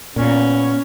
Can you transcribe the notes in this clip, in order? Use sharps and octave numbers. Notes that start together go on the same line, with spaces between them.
A#2 B3 C#4